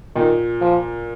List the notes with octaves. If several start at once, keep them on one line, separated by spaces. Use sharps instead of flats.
A#2 D#3
F3